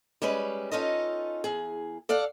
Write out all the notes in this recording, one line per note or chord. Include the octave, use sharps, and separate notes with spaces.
G3 G#3 C#4 B4
C#4 D#4 F4 A4 D#5
E2 G#4
A4 D5 F5 F#5